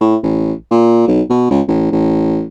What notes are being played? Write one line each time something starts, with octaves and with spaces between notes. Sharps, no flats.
A2
A1
A#2
B1
B2
C#2
A1
A1